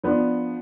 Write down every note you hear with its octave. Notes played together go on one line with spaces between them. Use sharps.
F3 B3 D4